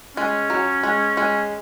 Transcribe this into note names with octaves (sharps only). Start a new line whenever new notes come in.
G#3 C#4
F#3
G#3
G#3